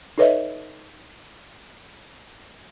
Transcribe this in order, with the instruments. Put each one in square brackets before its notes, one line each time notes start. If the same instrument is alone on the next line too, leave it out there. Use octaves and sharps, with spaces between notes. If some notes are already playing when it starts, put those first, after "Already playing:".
[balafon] D#4 A4 B4 C#5 D#5 E5